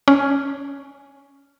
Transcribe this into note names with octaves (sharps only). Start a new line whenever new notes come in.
C#4